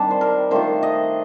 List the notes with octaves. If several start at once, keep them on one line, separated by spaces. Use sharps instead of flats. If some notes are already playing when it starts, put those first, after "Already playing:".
Already playing: D#3 G3 C4 D4 A5
C5
A#4
D#3 A3 D4 F4 C5
D#5